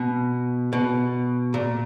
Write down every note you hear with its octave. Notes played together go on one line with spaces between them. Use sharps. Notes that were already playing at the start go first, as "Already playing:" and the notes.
Already playing: B2
B2
A#2